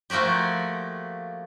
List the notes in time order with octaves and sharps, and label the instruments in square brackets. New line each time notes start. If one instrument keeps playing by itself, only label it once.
[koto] F3 A3 A#3 F#4 G4